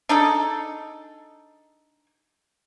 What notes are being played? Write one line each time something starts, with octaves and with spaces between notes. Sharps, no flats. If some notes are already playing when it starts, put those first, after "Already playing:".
D4 D#4 G#4 A4